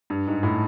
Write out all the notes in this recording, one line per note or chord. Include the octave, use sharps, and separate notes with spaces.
G2
G#2
A2